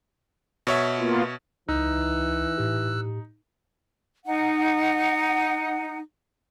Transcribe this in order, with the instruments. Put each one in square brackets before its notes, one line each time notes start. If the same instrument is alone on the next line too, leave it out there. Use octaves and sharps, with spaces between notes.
[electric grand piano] B2 C#5 E5
[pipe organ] A#3 B3 F4
[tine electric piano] C#2 [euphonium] E3 [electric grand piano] D#4 [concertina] E6 F#6
[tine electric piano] A2 G4
[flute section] D#4 F#5